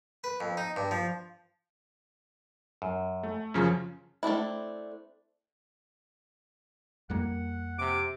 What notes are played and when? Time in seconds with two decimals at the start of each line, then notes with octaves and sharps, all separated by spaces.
0.24 B4
0.40 F2
0.57 D#4
0.76 G2
0.91 F3
2.82 F#2
3.23 A3
3.54 F#2 C#3 F3 C#4
4.23 A3 C4 D4 E4
7.10 F2 G3 A#3 F#5
7.79 C3 D6